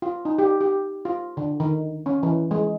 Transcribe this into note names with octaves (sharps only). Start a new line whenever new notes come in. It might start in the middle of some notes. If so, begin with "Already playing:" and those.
F4
D#4
G4
G4
F4
D3
D#3
C#4
E3
G#3